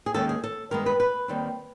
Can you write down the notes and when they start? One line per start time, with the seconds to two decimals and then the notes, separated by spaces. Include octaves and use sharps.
0.06 G#4
0.14 D#2 D#3 G#3 C#4 A4
0.29 G#4
0.44 A4
0.71 G2 D#3 G#3 B3 A#4
0.86 B4
1.00 B4
1.28 D#2 D#3 G3 C4